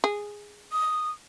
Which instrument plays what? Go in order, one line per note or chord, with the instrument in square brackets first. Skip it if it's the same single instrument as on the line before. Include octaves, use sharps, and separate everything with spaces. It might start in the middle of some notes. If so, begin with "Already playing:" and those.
[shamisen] G#4
[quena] D#6